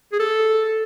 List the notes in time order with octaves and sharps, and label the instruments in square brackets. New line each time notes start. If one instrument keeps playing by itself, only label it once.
[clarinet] G#4
A4